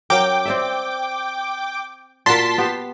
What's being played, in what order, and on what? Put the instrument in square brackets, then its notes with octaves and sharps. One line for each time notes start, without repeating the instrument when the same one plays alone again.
[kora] F#3 C#4 A#4 [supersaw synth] G5 D6
[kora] C4 D5 E5
[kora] A#2 F#4 A#4 [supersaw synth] A5 C6 B6
[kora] B3 G4